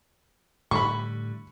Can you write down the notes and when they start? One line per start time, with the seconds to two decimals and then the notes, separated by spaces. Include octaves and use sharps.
0.71 A2 D3 G3 B5 C#6